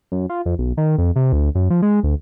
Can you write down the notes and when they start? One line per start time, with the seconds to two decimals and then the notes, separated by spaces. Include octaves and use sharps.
0.12 F#2
0.30 F4
0.46 F2
0.59 B1
0.77 D#3
0.98 F2
1.16 C3
1.33 D2
1.55 F#2
1.70 F3
1.82 G#3
2.03 D2